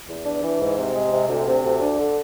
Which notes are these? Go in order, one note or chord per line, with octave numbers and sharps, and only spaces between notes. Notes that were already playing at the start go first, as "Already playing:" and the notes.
E2
D4
E3
G#2
C3
G#3
C3
D2
C3
D2
D4
D3